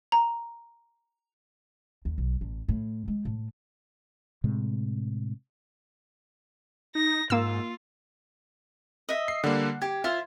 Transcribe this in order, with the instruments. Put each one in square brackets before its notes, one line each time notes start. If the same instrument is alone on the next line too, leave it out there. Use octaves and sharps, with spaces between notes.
[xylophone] A#5
[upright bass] D#2
B1
A1
A2
G#3
A2
[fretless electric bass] A2 C3 G#3
[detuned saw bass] D#4 [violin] A#6
[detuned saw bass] G#2 [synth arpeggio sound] A#3 E6 [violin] F4
[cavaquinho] D#5 E5
[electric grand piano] C7
[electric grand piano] D3 G3 A#3 [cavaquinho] F#5
[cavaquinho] G4 [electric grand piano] G#6
[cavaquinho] F4 C5 [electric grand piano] E5 F5